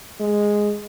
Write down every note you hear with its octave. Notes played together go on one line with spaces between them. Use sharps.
G#3